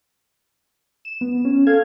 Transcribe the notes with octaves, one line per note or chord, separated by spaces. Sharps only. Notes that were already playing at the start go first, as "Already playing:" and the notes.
E7
B3
C#4
A4 F5 G#6